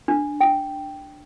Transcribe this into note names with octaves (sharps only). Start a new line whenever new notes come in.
D4
G5